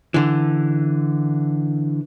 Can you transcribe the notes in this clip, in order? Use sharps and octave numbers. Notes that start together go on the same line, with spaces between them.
D3 E3